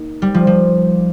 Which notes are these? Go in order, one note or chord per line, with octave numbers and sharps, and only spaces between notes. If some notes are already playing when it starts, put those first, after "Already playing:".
Already playing: A#3 D#4
G3
F3
F3